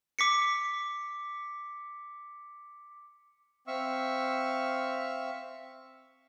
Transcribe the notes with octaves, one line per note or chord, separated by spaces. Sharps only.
D6 B6 C#7
C4 E5 F5 C#6 E6